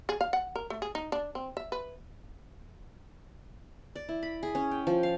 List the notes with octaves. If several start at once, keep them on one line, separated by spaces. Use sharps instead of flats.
G#4
F5
F#5
A#4
A3
G#4
D#4
D4
C4
E5
B4
D5
E4
B5
G#4
C#4
G5
F3
F5